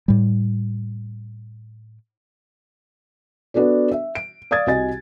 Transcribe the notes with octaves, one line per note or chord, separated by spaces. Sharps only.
A2 G3
B3 D4 F#4 A4 D5
E5
D7
D5 F5 D#6 G#6 A6
C2 F#4 D#5 G#5 A6